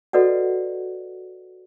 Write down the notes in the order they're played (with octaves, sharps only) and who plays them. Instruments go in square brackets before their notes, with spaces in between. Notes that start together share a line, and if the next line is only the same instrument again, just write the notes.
[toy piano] F#4 A4 B4 D5 D#5 F#5